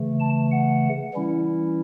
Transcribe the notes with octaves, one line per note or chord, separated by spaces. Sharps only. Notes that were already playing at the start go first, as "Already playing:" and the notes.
Already playing: C#3 E3 A3
A5
F#5
E3 G3 C#4 E4